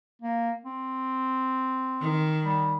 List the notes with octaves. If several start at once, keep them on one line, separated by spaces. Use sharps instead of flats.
A#3
C4
D#3
G3